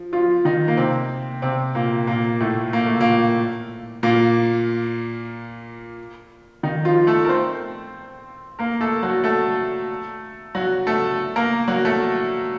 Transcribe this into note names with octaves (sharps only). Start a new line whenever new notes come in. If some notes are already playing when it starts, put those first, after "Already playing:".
Already playing: F3
F3 F4
D#3 D#4
A#3
C3 C4
C3 C4
A#2 A#3
A#2 A#3
A2 A3
A#3
A3
A#2 A#3
A#2 A#3
D#3 D#4
F3 F4
A3 A4
A#4
C4 C5
A#3 A#4
A3 A4
F#3 F#4
A3 A4
F#3 F#4
A3 A4
A#3 A#4
F#3 F#4
A3 A4